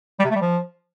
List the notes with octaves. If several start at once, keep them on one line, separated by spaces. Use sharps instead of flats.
G3
C3
A3
G3
F3